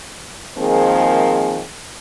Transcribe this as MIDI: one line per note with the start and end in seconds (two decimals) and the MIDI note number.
0.58 1.62 51
0.58 1.62 53
0.58 1.62 56
0.58 1.62 58
0.58 1.62 60
0.58 1.62 68